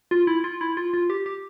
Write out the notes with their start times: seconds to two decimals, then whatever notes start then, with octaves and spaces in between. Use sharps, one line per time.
0.11 F4
0.27 E4
0.44 F4
0.61 E4
0.77 F4
0.94 F4
1.10 G4
1.26 G4